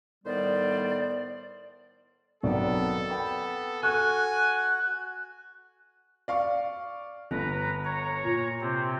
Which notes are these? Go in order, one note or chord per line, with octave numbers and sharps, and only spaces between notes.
A2 D#3 G3 B3 C5 D5
B1 D#3 B3 C4 A4 D5
B3 G5 B5
F#4 A4 G#5 C#6 F6 F#6
D5 F5 C#6
G1 B4 A#5
C#5 A#5
A#2
C3 C4